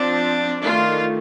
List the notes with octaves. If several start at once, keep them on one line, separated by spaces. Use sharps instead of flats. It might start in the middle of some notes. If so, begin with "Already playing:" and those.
Already playing: F3 C4 D4
D#3 A3 D4 F4